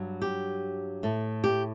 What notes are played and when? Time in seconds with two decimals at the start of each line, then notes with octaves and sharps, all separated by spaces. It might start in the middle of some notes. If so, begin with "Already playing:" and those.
Already playing: G2 F#3
0.22 G4
1.03 A2 A3
1.44 G4